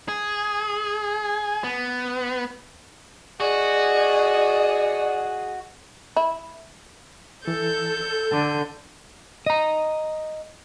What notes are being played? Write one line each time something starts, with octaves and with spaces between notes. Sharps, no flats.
G#4
B3
F#4 G#4 D5 D#5
E4
E3 A4 G6
D3 A5 D6
D#5 A#5